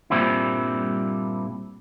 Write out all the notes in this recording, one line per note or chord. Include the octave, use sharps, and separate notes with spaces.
G2 A#2 G3 C4 D4 E4